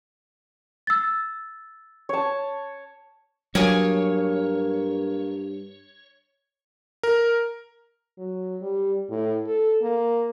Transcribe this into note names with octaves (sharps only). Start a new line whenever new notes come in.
E6 A6
C#5 A5
G2 F#3 A#3 C#5 G#5 D#6
A#4
F#3
G3
A2
A4
A#3